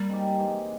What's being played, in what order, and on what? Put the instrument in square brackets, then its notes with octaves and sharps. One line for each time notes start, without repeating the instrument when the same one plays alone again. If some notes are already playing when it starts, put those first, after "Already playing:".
Already playing: [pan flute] G3 [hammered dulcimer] A#3
[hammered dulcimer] G#3 C4 D#4 G4
C3 E3 G#3